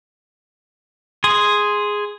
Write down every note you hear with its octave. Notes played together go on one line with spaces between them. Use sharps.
G#4 C6 D#6